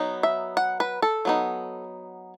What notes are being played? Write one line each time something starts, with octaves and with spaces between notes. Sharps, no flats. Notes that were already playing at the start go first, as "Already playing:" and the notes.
Already playing: F#3 B3 D#4
E5
F#5
B4
A4
F#3 B3 D#4